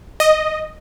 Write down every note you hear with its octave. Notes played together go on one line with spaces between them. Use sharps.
D#5